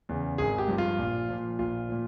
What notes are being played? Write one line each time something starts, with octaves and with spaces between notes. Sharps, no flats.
E2 C#3
G#1 G#4
G4
G2 F3
F4
A#1
A#2 F3
A#1 F4
A#2 F3